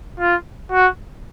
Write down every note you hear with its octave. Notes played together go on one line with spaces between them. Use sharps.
F4
F#4